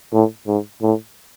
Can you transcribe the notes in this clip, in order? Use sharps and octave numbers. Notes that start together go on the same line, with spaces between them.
A2
G#2
A2